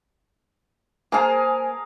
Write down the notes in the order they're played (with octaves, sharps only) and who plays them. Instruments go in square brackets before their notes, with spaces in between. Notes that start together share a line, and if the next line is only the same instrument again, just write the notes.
[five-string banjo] A#3 C5 [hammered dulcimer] G#4 A#4 F5 [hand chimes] G#5 A5